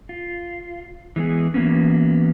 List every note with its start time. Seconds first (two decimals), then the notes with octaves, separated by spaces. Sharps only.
0.09 F4
1.16 E3 G#3 B3 G#4
1.54 E3 F#3 A#3 B3 C#4